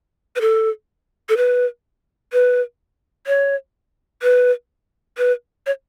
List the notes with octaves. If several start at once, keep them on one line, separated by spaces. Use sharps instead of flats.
B4
A4
A4
B4
B4
C#5
B4
B4
C#5